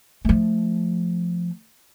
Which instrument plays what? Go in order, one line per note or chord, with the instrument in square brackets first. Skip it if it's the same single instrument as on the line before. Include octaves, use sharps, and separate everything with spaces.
[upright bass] F3 A3